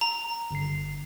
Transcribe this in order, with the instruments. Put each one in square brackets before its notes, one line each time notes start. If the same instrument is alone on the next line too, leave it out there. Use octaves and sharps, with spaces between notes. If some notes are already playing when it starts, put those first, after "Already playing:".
[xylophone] A#5
[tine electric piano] G1 D3 C7